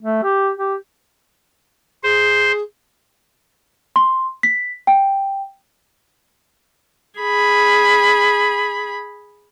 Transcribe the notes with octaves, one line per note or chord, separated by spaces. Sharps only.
A3
G4
G4
G#4 C5
C6
B6
G5
G#4 B5